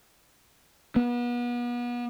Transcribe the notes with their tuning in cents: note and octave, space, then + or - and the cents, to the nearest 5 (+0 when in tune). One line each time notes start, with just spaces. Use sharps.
B3 -35